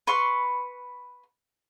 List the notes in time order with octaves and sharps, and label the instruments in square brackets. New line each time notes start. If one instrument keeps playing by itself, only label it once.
[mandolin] B4 C6 C#6 F6